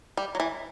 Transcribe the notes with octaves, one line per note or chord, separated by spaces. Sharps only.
G3
F#3
E3